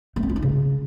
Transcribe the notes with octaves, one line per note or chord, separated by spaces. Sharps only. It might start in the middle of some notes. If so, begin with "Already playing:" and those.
A3
C4
F4
D#4
C#3